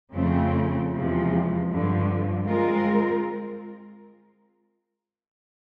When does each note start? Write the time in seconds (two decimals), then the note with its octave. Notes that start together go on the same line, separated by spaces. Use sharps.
0.14 F2 C#3 F3 A3 C4
0.92 E2 C3 F3 G#3
1.70 G2 D3 F3
2.47 G#3 C4 F4 A#4